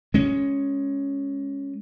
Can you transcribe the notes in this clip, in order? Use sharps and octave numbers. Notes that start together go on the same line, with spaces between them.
G#3 C#4